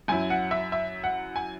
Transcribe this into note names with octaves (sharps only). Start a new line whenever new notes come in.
F#2 F#3 E4 G#5
F#5
E5
E5
F#5
G#5